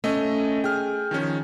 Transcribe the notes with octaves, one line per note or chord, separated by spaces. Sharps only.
A3 C#4 D#5
G#4 G5 F6
D#3 F3 C#4